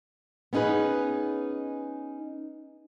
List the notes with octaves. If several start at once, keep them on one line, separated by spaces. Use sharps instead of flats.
B3 C#4 D#4 G#4 B4